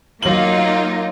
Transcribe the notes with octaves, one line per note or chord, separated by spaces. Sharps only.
F#3 A#3 D#4 F4 F#7